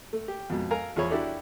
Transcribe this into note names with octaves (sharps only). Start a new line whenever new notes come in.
A3
G4
F2 G#2 B2
A4 A#4 F5 G#5 A#5
E2 F3 G#4 C#5 B5
D4 E4 F#4 G4 A4 D5